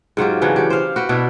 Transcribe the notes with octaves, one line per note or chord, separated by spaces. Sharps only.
G#2 F#3 F4 G4
C#3 E3 F#3 D4
G4 C#5
C5 F5
F#4 B4 G5
B2 D4 E4